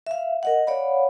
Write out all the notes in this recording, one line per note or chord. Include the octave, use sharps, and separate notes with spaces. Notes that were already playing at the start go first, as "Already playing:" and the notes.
E5 F5
A#4 D#5 F#5
C#5 D5 F5 F#5 B5